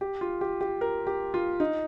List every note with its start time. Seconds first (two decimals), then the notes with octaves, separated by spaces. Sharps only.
0.01 G4
0.21 F4
0.41 G4
0.61 G4
0.81 A#4
1.07 G4
1.34 F4
1.60 D#4